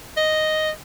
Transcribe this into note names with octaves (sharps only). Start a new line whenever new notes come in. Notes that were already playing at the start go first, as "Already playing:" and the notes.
D#5